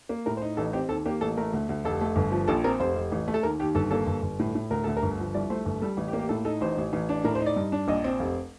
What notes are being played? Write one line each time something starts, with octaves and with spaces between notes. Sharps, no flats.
A#3
A2 A#4
C5
D#4
A1 A4
C4 G4
D#2 A4
A#3 G4
A1 A4
A3 A#4
D2
D2
F1 A4
A3
G1
F3
A#1 A4
C4 A#4
F1 C5
F1
A1
A3
A4
D#2 A#4
D#2 G4
G1 A4
A#3 A4
G1
G1
A2
A2
D2 A#4
D2 A4
A#4
G1
F3
C2 D5
A3 C5
G1
G3 A4
A1
G4
A#3
G4
A2 A4
D#4 A4
A1 C5
A1
A1
D4
A2 A#4
C5
D#4
D5
G2
D4
A#1 D#5
C4
F1